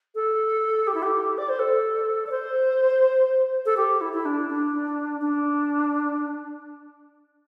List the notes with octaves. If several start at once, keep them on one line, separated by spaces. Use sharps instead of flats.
A4
G4
E4
G4
D5
C5
A4
D5
C5
A4
G4
E4
E4
D4
D4
D4